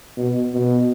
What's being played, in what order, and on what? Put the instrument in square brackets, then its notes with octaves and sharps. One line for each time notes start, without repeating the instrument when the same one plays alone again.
[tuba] B2
B2